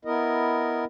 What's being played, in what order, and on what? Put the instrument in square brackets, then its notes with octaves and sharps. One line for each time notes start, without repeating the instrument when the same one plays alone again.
[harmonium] B3 E4 A#4 D#5